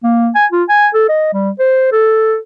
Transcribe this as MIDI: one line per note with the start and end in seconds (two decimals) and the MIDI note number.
0.03 0.30 58
0.35 0.46 80
0.52 0.64 65
0.69 0.88 80
0.94 1.07 69
1.09 1.28 75
1.33 1.50 55
1.59 1.92 72
1.92 2.37 69